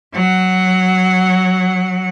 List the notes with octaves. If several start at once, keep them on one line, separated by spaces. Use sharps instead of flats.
F#3 F#5